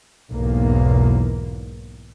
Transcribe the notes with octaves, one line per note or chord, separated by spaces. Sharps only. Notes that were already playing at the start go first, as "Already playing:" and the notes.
B1 E2 G#2 A#3